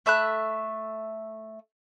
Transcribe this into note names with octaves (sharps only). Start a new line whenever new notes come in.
A3 E5 B5 F#6